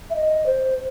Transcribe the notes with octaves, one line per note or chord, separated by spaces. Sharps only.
E5
D#5
C5